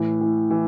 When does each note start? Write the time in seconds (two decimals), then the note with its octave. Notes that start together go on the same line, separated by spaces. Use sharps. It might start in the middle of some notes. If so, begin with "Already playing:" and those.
Already playing: A2 E3
0.21 E3
0.51 E3